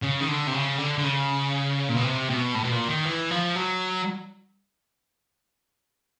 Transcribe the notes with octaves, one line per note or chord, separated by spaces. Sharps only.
C#3
D#3
D3
C3
C#3
D3
D3
C#3
A#2
B2
C3
B2
A2
B2
A#2
D#3
E3
F3
F#3